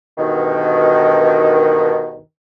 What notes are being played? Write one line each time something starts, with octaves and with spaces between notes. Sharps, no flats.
D2 G2 B2 D#3